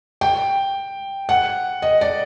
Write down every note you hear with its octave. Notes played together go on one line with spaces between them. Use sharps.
G5
F#5
D#5
D5